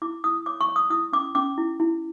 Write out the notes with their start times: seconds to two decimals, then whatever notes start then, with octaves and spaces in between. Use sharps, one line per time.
0.02 E4 D6
0.24 E4 D#6
0.46 C#5 D6
0.61 C#6
0.68 C#5
0.76 D#6
0.90 E4 D#6
1.13 C#4 D6
1.35 C#4 D6
1.58 E4
1.80 E4